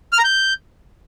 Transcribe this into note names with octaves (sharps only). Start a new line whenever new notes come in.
F6
A#5
G6